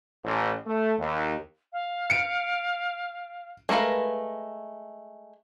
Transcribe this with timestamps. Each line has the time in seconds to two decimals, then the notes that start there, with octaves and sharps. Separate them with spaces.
0.24 A1
0.67 A3
0.99 D#2
1.73 F5
2.10 C#7 D7
3.69 G#3 A3 A#4 B4 F5